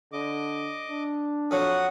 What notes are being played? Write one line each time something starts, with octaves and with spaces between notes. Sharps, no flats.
D3 D#5 D6
D4
F2 F#3 F#4 F#5 D#6